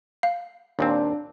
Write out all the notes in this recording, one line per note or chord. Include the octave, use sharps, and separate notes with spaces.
F5
D#2 A#2 C4 D4